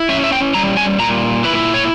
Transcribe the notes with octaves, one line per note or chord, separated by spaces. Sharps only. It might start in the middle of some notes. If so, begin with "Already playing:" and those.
Already playing: E4
C#4 E5
E5
G5
G3 A#5
G#5
A#2 A#5
E4 B4
C#5